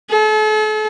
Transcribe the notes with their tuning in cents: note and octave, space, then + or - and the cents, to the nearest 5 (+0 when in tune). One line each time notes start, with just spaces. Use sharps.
A4 -40